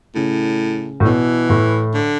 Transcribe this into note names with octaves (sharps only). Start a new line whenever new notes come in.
A2 C#3
A2
B2 E3
A2
D3